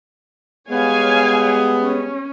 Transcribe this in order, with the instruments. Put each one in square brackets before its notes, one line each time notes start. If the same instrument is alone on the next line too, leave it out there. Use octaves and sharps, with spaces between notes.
[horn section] G3 G#3 B3 [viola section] C#5 F5 G#5
[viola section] C#4